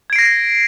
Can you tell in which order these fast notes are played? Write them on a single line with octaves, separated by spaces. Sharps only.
G#6 D7 C7 A#6